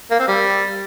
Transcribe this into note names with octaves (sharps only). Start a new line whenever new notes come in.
A#3
C4
G3